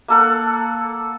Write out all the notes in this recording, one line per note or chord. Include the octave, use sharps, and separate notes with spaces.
A#3 A4 F#5